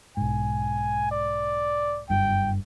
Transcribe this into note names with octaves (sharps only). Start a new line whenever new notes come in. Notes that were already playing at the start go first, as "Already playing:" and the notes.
B1 G#2 G#5
D5
F#1 G2 G5